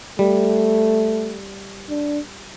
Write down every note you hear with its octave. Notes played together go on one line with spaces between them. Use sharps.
G3 A3
D4